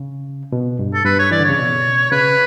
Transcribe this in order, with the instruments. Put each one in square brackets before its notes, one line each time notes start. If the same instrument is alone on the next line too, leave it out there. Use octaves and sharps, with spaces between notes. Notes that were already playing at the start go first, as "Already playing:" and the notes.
Already playing: [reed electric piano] C#3
B2
G2
[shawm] A4
[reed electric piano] G2 [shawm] B4
[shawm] C#5
[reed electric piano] E3 [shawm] D5
[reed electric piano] D3
[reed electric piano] C#3 [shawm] C#5
[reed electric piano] B2
[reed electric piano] C#3 [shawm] B4